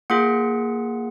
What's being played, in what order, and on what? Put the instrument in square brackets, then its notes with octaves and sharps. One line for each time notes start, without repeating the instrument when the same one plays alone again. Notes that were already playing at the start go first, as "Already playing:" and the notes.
[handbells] A#3 F4 G#4 F#5